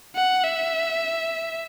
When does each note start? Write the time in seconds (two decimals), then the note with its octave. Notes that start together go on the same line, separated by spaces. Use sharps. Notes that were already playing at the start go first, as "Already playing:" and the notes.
0.16 F#5
0.44 E5